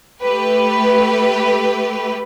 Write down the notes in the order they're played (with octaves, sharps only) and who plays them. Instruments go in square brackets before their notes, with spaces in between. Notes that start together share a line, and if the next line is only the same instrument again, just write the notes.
[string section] A3 G4 B4